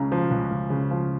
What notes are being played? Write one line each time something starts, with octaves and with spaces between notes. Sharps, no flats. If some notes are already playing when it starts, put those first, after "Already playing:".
Already playing: C#2 C#3 A#5
F3
C#2
C#2
C#3
F3